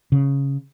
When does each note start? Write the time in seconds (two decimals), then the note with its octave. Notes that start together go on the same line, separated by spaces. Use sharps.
0.12 C#3